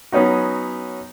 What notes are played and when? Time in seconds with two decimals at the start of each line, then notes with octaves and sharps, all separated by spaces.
0.12 F#3 B3 C#4 D#4 F#4